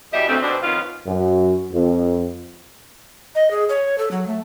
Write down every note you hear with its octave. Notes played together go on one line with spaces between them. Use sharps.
E2 B2 G3 G4 D#5 E5
D2 A3 C4
B2 C4 D4
F2 D#3 B3 C#4 F4
F#2
F2
D#5
G#4
C#5
A4
F#3
A3